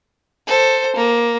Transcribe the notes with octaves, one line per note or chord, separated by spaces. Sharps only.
A4 C5
A#3